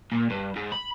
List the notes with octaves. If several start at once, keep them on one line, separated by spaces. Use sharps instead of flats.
A#2
G2
G#2
B5